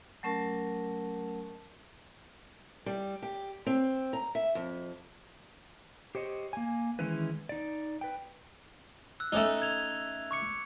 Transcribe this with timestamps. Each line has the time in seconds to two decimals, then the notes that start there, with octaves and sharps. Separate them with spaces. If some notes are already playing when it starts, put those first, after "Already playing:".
0.23 F#3 A3 C#4 A#4 A5
2.86 G3
3.23 G4
3.66 C4
4.13 A#5
4.35 E5
4.55 F2
6.15 G4 C5 C#5 D#5
6.53 A#3 G#5
6.99 D#3 E3 G#3 C#4 E4 B4
7.49 D#4 D5
8.01 B4 G5
9.20 E6 F#6
9.32 A3 C#4 D#4 G7
9.62 G#6 F7
10.31 C#6 D6 C#7